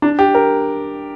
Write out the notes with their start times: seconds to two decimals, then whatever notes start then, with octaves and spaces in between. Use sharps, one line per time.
0.02 D4
0.19 G4
0.35 A#4